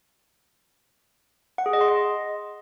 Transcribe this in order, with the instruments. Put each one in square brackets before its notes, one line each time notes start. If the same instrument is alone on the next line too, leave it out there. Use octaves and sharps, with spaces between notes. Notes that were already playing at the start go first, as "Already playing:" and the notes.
[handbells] F#5
G#4
D#5
C6
D#5